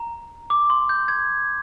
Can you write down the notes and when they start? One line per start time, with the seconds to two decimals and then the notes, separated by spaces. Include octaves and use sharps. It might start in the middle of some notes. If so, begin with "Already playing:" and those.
Already playing: A#5
0.50 D6
0.70 C6
0.89 G6
1.08 G#6